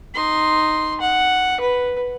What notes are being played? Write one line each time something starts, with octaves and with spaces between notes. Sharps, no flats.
D#4 C6
F#5
B4